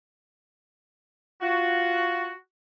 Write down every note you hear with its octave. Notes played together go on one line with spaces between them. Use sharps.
F4 F#4